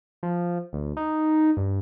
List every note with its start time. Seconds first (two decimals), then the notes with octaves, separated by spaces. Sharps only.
0.23 F3
0.73 D2
0.97 D#4
1.57 G2